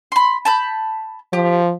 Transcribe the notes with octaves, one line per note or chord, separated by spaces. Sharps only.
B5 C6
A5 B5 G6
F3 G4